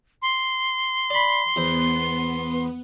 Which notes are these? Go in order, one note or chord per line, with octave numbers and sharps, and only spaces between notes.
C6
D5 B5
E2 B3 C5